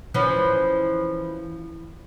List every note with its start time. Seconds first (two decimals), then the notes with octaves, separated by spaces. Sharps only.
0.14 E3 F3 C#4